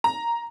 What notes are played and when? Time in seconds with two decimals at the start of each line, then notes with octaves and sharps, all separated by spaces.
0.04 A#5